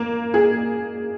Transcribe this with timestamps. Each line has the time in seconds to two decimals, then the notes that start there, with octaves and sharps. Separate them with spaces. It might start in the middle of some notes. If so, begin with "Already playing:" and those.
Already playing: A#3
0.34 G#4